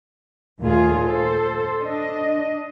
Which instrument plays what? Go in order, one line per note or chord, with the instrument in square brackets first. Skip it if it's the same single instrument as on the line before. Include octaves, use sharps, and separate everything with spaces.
[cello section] D#2 A#2 A3 F4 G#4
A4 C5
D4 D#5